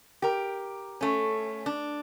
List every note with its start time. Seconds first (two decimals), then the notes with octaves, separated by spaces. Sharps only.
0.22 G4 A#4
1.01 A3 C#4
1.66 D4